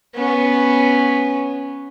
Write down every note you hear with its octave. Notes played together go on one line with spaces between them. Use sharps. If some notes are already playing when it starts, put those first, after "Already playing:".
B3 C#4